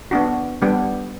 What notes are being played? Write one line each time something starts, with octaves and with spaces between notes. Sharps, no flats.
B3 D4 F#4
G3 B3 D4 G4